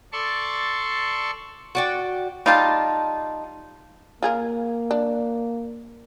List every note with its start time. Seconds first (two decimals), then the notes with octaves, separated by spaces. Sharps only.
0.13 A4 D5 A5 C6 C#6
1.75 F#4 D5 G5
2.46 G3 D#4 F4 A5
4.23 A#3 F4 G#4 A#4
4.91 D4